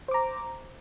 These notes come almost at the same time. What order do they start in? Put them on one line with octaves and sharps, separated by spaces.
C5 D6 A#5